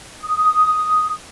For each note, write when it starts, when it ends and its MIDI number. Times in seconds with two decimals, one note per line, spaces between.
0.21 1.12 87